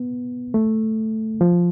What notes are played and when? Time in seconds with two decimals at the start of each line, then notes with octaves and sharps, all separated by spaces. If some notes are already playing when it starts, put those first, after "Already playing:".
Already playing: B3
0.54 A3
1.41 F3